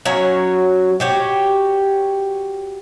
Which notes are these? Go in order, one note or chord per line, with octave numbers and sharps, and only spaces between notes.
F#3 C#4 F#4 C#5
F#4 G4 C#5